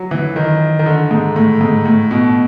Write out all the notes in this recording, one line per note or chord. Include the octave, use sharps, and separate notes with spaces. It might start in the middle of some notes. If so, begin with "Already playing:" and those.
Already playing: F#3
E3
D#3
D#3
D3
G#2
A2
G#2
A2
B2